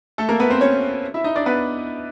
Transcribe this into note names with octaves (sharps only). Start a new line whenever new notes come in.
A3 A4
A#3 A#4
B3 B4
C4 C5
C#4 C#5
E4 E5
D#4 D#5
D4 D5
B3 B4